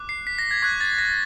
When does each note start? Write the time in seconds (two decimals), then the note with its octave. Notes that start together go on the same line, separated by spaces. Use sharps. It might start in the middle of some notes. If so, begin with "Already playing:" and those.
Already playing: D6 F#6
0.09 C7
0.27 B6
0.39 A#6
0.51 G#6
0.62 C#6 F#6 G#6
0.80 A6
0.98 A#6